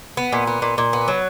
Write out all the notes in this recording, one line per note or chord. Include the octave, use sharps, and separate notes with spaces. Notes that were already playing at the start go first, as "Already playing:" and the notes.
B3
A#2
B3
A#2
A#2
B3
F#3